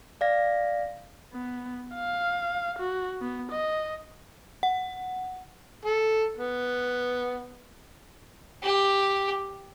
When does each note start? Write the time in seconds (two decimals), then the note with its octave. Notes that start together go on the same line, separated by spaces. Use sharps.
0.21 D5 F5 A#6
1.33 B3
1.94 F5
2.79 F#4
3.21 B3
3.51 D#5
4.63 F#5
5.85 A4
6.37 B3
8.63 G4